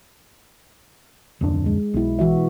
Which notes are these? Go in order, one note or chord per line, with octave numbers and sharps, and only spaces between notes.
D1 F2 D4
G#3
B1 B2 E4
E3 F#4 E5